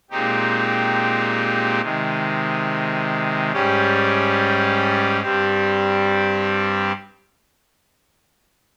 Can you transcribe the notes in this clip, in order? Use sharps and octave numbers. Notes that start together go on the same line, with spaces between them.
A#2 G#3 C4 D#4 G4
C3 D#3 G#3
G#2 G3 C#4 G4
G2 G3 C4 G4